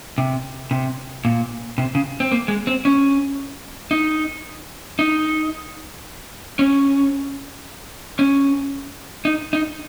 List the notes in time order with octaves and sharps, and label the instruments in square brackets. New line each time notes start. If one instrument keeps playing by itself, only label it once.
[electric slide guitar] C3
C3
A#2
C3
C#3
C4
A#3
G#3
C4
C#4
D#4
D#4
C#4
C#4
D#4
D#4